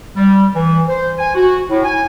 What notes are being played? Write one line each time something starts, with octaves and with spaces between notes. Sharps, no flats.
G3
E3
C5
G#5
F#4
A2
G#5